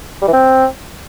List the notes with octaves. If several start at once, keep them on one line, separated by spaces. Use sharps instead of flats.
G3
E3
C4